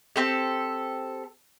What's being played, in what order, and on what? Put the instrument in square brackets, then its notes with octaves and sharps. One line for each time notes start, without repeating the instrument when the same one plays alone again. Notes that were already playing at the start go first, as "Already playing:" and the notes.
[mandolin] C4 G4 A4